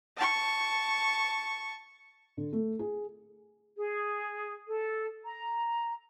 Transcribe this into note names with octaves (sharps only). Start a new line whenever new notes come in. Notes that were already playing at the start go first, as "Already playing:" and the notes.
A5 C#6
D3
A3
G#4
G#4
A4
A#5